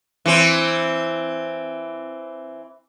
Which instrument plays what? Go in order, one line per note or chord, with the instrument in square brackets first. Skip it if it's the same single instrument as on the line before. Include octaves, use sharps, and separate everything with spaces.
[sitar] E3 C4